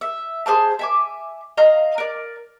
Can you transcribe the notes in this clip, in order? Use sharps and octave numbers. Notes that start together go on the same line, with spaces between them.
E5
G#4 C5 F5 A5
E5 G#5 D6
D#5 F5 A#5 F6
A#4 D5